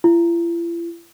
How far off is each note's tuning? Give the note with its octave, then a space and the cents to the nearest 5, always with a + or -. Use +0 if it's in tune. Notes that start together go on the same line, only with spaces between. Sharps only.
E4 +45